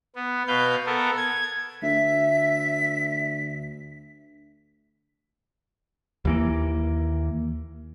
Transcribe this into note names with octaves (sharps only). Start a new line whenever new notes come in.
B3
B2 B4 F5 G6
B3 A4 A#4
G#6
D2 E5 B6
D#2 E3 A#3